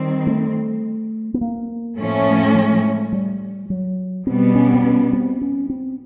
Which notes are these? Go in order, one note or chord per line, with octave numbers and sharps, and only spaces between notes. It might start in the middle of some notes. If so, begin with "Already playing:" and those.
Already playing: D#3 G3 C4
A3
B3
A#3
A2 F3 A3 C#4
G#3
G3
F#3
B2 G3 B3 C4
C#4
C4
C#4
C4
C#4
C4